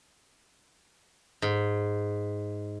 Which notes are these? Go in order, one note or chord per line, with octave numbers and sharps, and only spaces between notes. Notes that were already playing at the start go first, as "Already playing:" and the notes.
G#2